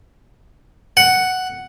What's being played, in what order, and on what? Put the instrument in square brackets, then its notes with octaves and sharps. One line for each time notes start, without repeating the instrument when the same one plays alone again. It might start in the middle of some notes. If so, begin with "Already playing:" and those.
[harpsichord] F#5